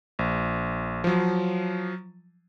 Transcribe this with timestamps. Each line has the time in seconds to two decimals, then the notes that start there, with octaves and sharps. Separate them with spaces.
0.19 A#1
1.04 F3 F#3